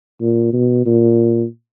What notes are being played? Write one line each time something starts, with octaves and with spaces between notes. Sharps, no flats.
A#2
B2
A#2